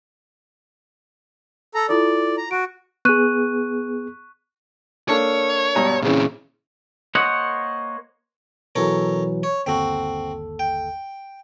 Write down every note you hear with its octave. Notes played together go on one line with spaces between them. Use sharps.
A4 A#5
E4 F4 A4 D5
A#5
F#4 D7
B3 G#4 C#6 F#6 D#7
A#3 D4 A4 C#5
G2 B2 A#5
A#2 C#3 E3 C4 C#4
A#3 C5 C#5 D#5 F#5
B2 E3 F#3 A4 A#4 C#5
C#5
G1 D#2 C4 F#4 A4
G5